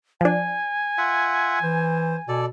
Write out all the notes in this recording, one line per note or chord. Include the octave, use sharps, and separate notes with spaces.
F3 D4 G#5
F4 E5 F#5
E3 C5
B2 A4 D5